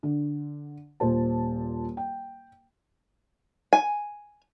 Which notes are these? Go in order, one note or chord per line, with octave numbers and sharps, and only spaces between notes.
D3
D#1 A#2 C5 A5
G5
G#5